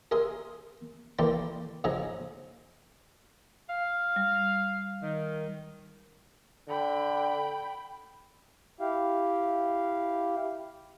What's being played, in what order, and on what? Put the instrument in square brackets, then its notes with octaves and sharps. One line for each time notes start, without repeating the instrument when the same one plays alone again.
[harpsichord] G#4 A#4 E5 C6 D#6
E3 A3 A#3 D5 G5 C6
F2 G#2 C#3 G#4 A#5
[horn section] F5
[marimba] G3
[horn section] D#3
[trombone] D3 [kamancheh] G5 B5
[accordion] E4 G4 F5